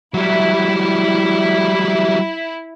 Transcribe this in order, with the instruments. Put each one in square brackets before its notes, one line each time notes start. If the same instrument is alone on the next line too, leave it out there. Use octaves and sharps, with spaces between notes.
[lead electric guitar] F#3 G3 [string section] E4